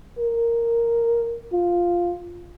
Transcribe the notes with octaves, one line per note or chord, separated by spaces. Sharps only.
A#4
F4